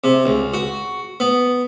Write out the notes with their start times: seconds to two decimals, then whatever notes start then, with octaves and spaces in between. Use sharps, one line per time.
0.04 C3
0.26 C#2
0.54 F#4
1.20 B3